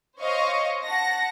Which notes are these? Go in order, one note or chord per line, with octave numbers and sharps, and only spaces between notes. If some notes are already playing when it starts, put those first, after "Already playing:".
C5 C#5 D#5 F5 C#6
F#5 A5 A#6